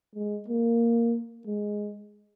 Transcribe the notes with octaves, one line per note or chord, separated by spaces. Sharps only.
G#3
A#3
G#3